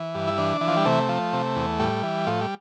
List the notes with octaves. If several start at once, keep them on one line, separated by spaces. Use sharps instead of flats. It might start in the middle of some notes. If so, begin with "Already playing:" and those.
Already playing: E3
G2
E4
E3 D4
E3
F3
G3
C3 A3
F3
C3
E2
A2 G3
E3
A2 F3
G3